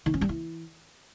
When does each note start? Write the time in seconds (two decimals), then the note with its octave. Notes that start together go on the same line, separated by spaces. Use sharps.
0.06 D#3
0.14 C#4
0.21 G3
0.29 E3